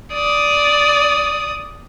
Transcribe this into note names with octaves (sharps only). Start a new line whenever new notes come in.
D5 D#6